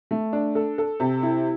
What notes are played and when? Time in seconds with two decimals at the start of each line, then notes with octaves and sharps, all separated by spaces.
0.11 A3
0.33 D4
0.55 A4
0.78 A4
1.00 C3
1.23 E4